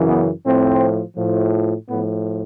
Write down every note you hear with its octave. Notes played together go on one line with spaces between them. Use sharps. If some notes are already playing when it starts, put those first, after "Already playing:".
Already playing: F#2 C#3 E3
B3
A2 F3 C4
A2 F3
A2 F3 B3